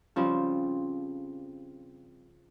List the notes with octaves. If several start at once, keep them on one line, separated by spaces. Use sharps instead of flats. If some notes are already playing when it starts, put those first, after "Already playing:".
C#3 F3 G3 C4